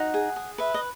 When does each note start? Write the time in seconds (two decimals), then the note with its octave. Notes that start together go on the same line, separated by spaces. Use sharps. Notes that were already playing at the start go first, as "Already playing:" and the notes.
Already playing: D#4 F#4 F#5
0.14 G#4
0.36 G#4
0.58 B4 E5
0.74 D#5